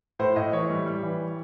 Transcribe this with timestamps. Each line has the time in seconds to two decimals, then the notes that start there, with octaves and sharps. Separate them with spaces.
0.19 A2 C5
0.36 A2 D#5
0.52 E3 C#5
0.70 G3
0.86 G3
1.03 E3